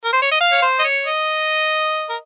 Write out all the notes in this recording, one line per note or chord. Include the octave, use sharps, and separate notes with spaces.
A#4
C5
C#5
D#5
F5
C#5
C5
D#5
C#5
D#5
A#4